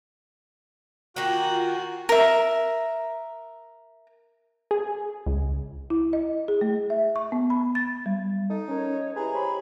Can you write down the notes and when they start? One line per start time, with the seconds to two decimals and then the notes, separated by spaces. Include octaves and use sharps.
1.16 D#3 A#3 F4 F#4 F#5 G#5
2.09 A#4 E5
4.71 G#4
5.26 C#2
5.90 E4
6.13 D#5
6.48 G#4
6.61 A3
6.90 E5
7.16 C#6
7.32 B3
7.50 B5
7.75 A6
8.06 G3
8.50 D#4 A4
8.69 C#4 A#4 C#5
9.16 E4 G4 G#4 B4 A#5
9.35 G4 C5 C#5 B5